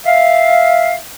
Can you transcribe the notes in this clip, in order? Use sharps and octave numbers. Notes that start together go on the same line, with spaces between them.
E5 F5